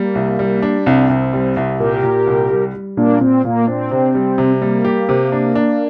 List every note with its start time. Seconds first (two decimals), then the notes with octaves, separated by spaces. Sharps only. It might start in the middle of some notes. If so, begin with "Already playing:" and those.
Already playing: G3 A#3
0.15 C2
0.39 G3
0.62 D4
0.86 C2 C4
1.09 C2
1.33 G3
1.57 C2
1.80 A#2 G4 A#4
2.04 A#2
2.27 C2
2.50 G3
2.74 G3
2.97 A#2 A#3 D4
3.21 A#2 C4
3.44 A#2 A#3
3.67 C4 D4
3.91 C3
4.15 G3
4.38 C3
4.61 G3 A#3
4.85 G4
5.09 C3
5.32 D4
5.55 D4